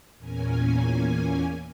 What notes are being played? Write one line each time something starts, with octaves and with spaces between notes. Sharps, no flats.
E2 A#2 A#3 C#4 G#5